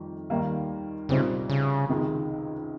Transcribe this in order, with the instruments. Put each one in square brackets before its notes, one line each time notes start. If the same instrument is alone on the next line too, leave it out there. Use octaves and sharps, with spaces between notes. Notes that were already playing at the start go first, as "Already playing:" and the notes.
Already playing: [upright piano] F2 D#3 G3
D#2 D#3 G3 A#3
[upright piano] C2 A#2 G3 C4 D#4 [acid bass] C#3
[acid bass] C#3
[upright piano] C#2 C3 D#3 G#3 D#4